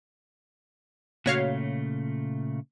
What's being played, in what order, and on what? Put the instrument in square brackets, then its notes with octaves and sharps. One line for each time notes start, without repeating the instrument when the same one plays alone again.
[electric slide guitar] A#2 C#3 A3 [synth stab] F#4 C#5 F5